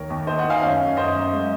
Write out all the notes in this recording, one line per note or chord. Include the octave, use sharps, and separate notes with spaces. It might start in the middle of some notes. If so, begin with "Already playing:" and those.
Already playing: D#2 A#4 C#5
D#2
D#3 C5 D#5
D#5 F#5
D#3
F5 G#5
F#2 C#5 F5
F#2
F#2 C5 D#5
F#2
G#3